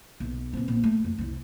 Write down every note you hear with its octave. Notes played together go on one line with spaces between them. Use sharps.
B1
B2 C4
A#1
A3
F2
C2 E4